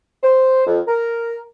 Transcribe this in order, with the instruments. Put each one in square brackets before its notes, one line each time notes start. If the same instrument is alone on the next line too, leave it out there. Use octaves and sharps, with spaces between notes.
[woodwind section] C5
F2
A#4